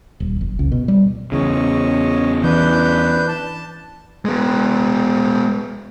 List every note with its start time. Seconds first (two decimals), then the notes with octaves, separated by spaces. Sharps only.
0.20 D#1
0.41 F#1
0.59 C#2
0.72 B2
0.88 G3
1.32 E2 C#3 C#5 D#5
2.44 E3 D4 B4 G6
3.28 A5
4.25 G#3 B3